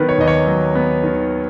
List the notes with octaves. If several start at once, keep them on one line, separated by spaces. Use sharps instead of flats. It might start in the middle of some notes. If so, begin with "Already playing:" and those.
Already playing: D#3 F#3 B3 A#4 B4
C#5
D#2 D#5
C#5
F#3
B3
D#3